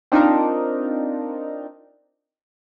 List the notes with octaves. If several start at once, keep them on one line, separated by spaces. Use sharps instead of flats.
C4 D4 D#4 F4 A#4